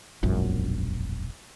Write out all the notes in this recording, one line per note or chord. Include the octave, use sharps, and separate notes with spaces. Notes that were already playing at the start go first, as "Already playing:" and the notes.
E1 A#1 F#2